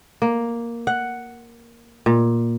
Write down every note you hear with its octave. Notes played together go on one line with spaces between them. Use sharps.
A#3
F#5
A#2